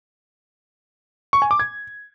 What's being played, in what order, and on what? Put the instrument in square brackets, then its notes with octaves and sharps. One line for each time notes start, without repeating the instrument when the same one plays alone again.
[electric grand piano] C#6
G#5
D6
G#6